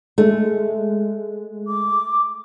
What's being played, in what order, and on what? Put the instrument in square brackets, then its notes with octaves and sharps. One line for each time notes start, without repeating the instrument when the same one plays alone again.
[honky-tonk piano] G#3 [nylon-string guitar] A3
[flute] D6